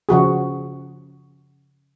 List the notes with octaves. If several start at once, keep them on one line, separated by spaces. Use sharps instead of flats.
C#3 F3 F#4 G#4